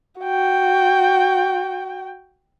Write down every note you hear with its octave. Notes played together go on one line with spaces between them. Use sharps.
F#4 G5